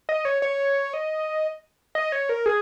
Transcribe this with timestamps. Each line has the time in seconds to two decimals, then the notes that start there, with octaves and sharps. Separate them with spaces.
0.09 D#5
0.25 C#5
0.42 C#5
0.94 D#5
1.95 D#5
2.12 C#5
2.29 A#4
2.46 G#4